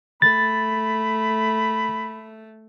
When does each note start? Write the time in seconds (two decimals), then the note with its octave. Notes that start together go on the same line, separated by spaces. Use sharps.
0.22 A3 B5 A6